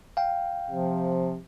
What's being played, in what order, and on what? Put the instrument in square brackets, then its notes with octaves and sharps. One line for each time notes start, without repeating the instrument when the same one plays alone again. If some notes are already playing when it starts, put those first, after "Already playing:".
[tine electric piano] F5 G5
[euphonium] C3 [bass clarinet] F3